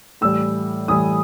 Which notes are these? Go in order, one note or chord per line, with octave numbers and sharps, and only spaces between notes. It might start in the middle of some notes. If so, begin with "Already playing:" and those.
A2 E3 G3 E6
A2 E3 G3 D#6